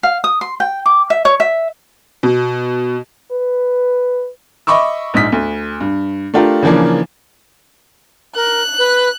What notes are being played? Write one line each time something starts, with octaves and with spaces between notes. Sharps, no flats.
F5
D#6
C6
G5
D6
E5
C#5
E5
B2
B4
D#5 E5 B5 C#6 D6 E6
A#1 G#2 D#6 B6
D2
G2
A3 D4 F4 G4 A#4
C#3 E3 F3 A#3 D4
A#4 F#6
B4